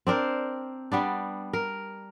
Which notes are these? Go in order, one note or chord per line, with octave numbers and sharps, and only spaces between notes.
C4 D4 A#4 C5
G3 B3 D4
A#4